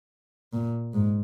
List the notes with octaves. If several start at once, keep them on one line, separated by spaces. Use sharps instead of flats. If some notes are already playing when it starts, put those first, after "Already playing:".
A#2
G#2